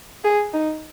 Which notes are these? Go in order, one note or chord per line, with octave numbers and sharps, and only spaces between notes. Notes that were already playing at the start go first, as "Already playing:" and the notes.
G#4
D#4